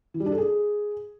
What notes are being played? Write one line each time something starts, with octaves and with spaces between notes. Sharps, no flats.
E3
G3
D4
A4
G#4